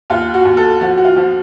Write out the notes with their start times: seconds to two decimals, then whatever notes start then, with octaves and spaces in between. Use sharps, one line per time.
0.10 D#2 F4
0.34 F#4
0.45 D#2
0.57 A4
0.81 F3 F#4
0.97 F#4
1.05 F4
1.16 F3